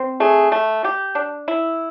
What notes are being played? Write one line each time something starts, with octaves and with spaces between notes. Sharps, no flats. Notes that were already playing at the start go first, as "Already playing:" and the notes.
Already playing: C4
A3 G#4
A3
G4
D4
E4